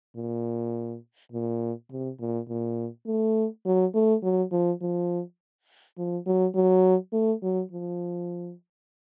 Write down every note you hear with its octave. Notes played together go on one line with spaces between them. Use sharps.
A#2
A#2
C3
A#2
A#2
A3
F#3
A3
F#3
F3
F3
F3
F#3
F#3
A3
F#3
F3